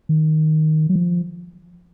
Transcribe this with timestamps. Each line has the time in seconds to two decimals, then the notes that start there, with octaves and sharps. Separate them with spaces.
0.09 D#3
0.89 F#3
0.95 F3